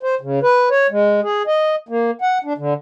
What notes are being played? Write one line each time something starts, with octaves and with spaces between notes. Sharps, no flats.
C5
C#3
B4
C#5
G#3
G#4
D#5
A#3
F#5
D4
D3